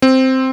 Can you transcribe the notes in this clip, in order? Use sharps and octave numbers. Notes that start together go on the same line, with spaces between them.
C4